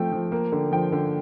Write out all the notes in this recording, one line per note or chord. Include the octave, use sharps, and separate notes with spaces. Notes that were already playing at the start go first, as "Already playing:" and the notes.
Already playing: F3 A3 C4 G5
F3
A#3
D3
F3 G5
D3